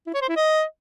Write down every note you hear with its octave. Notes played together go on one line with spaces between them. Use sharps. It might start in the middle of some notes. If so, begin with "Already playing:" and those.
E4
C#5
C5
E4
D#5